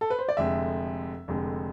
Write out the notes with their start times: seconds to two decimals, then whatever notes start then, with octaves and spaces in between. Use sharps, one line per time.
0.01 A4
0.10 B4
0.19 C5
0.29 D5
0.37 F1 F2 D3 G#3 E5
1.28 F1 F2 D3 G#3